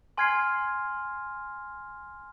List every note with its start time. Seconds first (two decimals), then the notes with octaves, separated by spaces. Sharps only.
0.17 G#5 C6 F6 G#6 C7